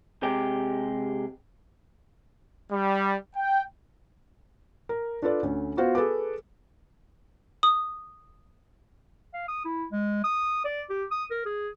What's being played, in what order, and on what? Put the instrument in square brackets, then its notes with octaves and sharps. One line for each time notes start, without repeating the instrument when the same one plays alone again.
[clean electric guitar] C3 G#3 G4
[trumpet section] G3
G5
[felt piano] A#4
D4 F4 A4 B4 D5
D2 C#4
B3 F4 F#4 C5 F5
G#4 A4 B4 D6
[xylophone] D#6
[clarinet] F5
D#6
E4
G#3
D#6
D5
G4
D#6
A#4
G#4